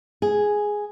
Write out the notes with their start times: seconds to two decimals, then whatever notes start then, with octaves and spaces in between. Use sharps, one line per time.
0.22 G#4